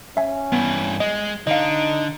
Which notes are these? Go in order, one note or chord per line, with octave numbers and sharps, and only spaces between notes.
C#4 E5 G#5
G2 E3 B3
G#3 D#5
D3 D#4 D#5 F5